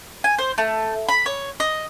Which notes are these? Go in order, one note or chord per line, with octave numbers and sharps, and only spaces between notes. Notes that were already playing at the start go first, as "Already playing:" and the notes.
G#5
C5
A3
B5
C#5
D#5